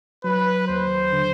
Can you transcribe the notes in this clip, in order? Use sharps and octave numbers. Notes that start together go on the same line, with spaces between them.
F#3 B4
D#2 C5
D3